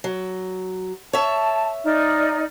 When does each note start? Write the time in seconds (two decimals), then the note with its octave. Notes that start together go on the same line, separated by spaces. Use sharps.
0.04 F#3
1.13 C#5 E5 A5
1.85 D#4 D5 F6